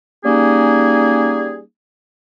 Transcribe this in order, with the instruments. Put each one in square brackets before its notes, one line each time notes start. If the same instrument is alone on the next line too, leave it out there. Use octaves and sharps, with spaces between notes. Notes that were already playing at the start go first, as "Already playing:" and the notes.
[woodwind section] G3 A#3 C#4 D#4 G#4